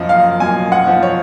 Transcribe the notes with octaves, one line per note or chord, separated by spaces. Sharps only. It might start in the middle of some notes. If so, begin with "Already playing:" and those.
Already playing: F#2 F3 D#5
F5
F#2 G#5
F#5
F3
C#5